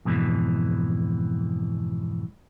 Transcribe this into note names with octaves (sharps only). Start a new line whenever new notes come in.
F2 G#2 B2 E3